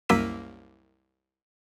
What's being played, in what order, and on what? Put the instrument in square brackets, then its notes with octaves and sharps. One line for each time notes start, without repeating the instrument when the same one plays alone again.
[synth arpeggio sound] C2 F#2 A#3 E6 B6 D#7